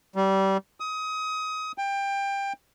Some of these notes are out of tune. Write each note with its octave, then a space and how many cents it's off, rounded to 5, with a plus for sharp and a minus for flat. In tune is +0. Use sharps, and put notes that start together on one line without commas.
G3 -20
D#6 +25
G5 +20